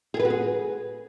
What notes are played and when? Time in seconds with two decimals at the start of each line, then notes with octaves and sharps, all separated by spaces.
0.14 G#4
0.20 B4
0.25 F#4
0.30 G#4